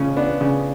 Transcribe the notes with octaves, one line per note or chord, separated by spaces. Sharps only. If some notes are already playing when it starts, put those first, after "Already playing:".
Already playing: C#3 F3 C#4
B3 D4
C#3